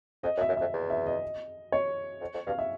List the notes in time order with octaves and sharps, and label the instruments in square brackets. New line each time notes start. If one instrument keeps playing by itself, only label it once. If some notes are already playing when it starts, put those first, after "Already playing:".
[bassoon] F2 [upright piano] D#5
[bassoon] F#2
[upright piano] E5
[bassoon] F#2
[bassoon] F2 [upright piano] E5
[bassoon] E2
[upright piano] E5
D#5
C#5
[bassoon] F2
F2
[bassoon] G2 [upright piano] F5
[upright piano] E5